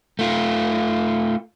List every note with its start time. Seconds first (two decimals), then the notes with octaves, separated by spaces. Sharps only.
0.19 A3 F4